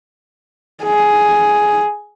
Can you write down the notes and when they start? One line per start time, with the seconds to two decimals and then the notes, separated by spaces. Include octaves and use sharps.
0.83 G#4